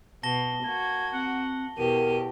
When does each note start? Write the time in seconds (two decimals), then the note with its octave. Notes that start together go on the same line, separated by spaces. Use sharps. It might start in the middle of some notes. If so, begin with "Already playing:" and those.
0.23 B2 A5 A#6 G7
0.64 A#3 F#4 G#6
1.12 C4 F#5
1.77 E2 B2 G4 A#4 D#7